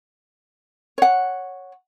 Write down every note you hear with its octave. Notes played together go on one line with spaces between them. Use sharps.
C#5 F#5